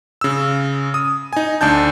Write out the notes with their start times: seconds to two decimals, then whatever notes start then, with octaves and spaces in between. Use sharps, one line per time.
0.21 C#3 E6
0.94 D#6
1.33 D#4 G#5
1.61 D2 D4 A5 G6